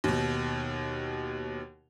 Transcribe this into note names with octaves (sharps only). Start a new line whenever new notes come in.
D#2 B2